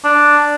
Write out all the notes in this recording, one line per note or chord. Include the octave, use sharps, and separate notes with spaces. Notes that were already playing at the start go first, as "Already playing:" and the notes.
D4